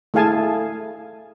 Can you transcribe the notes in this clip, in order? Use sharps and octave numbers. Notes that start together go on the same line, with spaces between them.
A3 E4 G#4 F5 G#5 A5